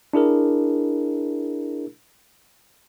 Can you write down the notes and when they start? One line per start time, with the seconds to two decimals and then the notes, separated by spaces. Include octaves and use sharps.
0.13 D4 E4 G#4 A#4